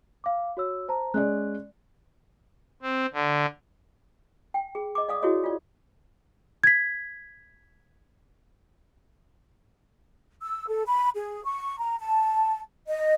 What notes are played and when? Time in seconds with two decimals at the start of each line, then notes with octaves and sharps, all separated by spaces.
0.24 F5 D6
0.57 F#4 C#5 E6
0.88 C5 A5 A#5
1.14 G#3 C#4 D5 F#6
2.82 C4
3.13 D3
4.54 G5
4.75 G#4
4.95 D#5 D6
5.09 D5 F5 D#6
5.22 E4 F#4 G#4 C#5 D#5
5.44 F4 D5
6.64 G#6 B6
10.42 E6
10.68 A4
10.86 B5
11.15 G#4
11.45 C#6
11.78 A#5
11.99 A5
12.88 D#5